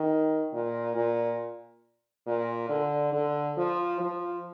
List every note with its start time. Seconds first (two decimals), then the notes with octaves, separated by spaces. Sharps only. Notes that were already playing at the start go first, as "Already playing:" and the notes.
Already playing: D#3
0.53 A#2
0.96 A#2
2.27 A#2
2.69 D3
3.13 D3
3.57 F3
4.00 F3